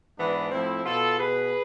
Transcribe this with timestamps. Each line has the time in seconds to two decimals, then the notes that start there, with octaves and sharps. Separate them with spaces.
0.18 G#2 E3 B3 D4
0.51 A2 F3 C4 E4
0.85 B2 F4 A4
1.18 B2 G#4 B4